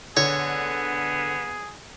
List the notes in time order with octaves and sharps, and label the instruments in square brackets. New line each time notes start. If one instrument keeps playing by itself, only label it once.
[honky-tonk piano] D3 [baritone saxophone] B3 [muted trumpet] G#4 [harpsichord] C#5